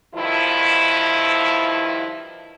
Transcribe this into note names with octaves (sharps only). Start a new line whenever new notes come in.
G2 D#3 F3 E4